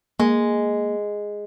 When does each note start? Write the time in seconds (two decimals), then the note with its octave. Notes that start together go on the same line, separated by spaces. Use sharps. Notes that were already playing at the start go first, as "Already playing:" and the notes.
0.20 G#3 A#3